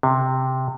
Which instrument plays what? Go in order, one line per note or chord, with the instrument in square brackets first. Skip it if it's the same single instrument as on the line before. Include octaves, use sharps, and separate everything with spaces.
[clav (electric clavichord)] C3